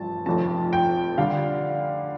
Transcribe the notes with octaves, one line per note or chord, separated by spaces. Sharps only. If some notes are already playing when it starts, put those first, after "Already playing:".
Already playing: A1 G2 F3 A3 A5
F1 F2 F3 A3 A5
G5
D3 G3 F5